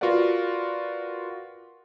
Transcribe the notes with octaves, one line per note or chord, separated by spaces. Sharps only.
F4 F#4 A#4 B4 D5 F#5